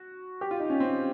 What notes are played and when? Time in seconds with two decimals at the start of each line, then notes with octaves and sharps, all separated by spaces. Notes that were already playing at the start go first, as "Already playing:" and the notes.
Already playing: F#4
0.41 G4
0.51 F4
0.60 D#4
0.70 C#4
0.80 C4